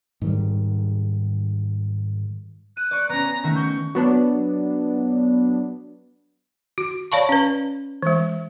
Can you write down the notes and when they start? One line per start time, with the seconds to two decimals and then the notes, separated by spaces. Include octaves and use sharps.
0.22 G#2 D#3 G3
2.77 F#6 D#7
2.91 D5 C#6
3.09 B3 C#4 A#5
3.44 D#3 A3 F#4
3.56 C#6 G6
3.95 F#3 B3 D4
6.78 F#4
7.12 C#5 D5 F5 A5 B5 C#6
7.29 C#4 B4
8.02 E3 G#3